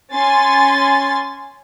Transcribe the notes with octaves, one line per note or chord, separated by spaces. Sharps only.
C#4 G#5 C6 A6